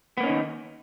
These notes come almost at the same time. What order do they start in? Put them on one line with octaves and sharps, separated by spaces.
B3 A#3 C#4 D#4 D#3